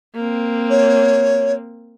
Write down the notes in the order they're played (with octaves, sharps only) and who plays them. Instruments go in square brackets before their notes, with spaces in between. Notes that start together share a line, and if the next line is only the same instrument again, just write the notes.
[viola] A#3 C4
[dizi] C#5